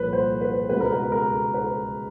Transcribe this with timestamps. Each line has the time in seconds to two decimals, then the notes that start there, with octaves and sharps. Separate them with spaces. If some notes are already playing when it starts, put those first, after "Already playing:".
Already playing: C2 A#2 F3 B4 C#5
0.13 C5
0.41 B4
0.69 C#2 B2 G#3 B4
0.81 A#4
0.92 B4
1.12 A#4
1.54 B4